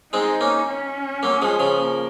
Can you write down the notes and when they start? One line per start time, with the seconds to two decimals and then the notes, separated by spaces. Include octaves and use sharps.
0.13 G#3 C4 D#4
0.41 A#3 C#4
0.68 C#4
1.23 F#3 A#3
1.42 F3 G#3
1.60 C#3 F3
1.78 A#3